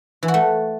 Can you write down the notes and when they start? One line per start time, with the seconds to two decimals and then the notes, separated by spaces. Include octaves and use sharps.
0.23 E3
0.28 F#4
0.34 A3